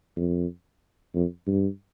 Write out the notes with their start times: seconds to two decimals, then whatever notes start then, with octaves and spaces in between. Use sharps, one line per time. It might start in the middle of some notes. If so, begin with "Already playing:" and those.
0.17 F2
1.15 F2
1.47 G2